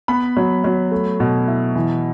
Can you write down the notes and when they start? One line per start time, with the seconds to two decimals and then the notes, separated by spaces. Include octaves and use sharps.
0.08 B3 B5
0.37 F#3
0.64 F#3
0.91 A3
1.20 B2
1.48 E4
1.75 E3